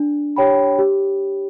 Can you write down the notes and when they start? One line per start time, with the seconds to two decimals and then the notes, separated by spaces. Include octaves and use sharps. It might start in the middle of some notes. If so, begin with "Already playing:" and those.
Already playing: D4
0.36 G4 C#5 G5 B5
0.79 G4